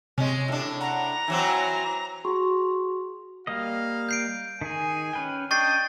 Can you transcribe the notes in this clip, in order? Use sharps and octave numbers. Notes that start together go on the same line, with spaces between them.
C3 G#3 C#4
A2 D4
F#5 A#5
E3 F#3 C4
F#4 G#4 C6 C#6
G3 A#3 D#5 F5
G6 C7 D7
D#3 G#4 G#5
C#4 B4 G5
D4 D#5 G5 C#6 A6 C7